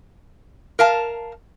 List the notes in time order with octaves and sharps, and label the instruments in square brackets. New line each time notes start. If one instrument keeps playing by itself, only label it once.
[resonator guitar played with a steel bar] A#4 F5 A5